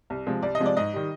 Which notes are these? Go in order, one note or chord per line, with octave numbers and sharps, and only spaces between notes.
C2
C3 F3 G#3
C2 D5
D#5
C3 F3 G#3
D5
G#2 D#5
D#3 G3